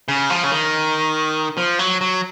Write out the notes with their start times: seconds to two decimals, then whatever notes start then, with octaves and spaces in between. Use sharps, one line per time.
0.08 C#3
0.30 F3
0.44 C#3
0.51 D#3
1.58 F3
1.79 F#3
2.01 F#3